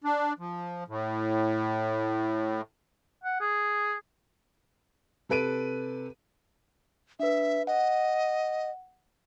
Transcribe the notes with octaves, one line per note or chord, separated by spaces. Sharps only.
D4
F3
A2
F#5
G#4
C3 A4 B4 D7 D#7
D4 B4 E5
D#5 F#5